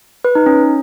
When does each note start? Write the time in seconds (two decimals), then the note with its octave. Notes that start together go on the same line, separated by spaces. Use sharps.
0.25 B4
0.35 D#4
0.46 C#4